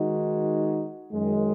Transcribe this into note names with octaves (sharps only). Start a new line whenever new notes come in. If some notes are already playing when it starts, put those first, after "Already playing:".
Already playing: D#3 G#3 D#4 F#4
F#2 D#3 G#3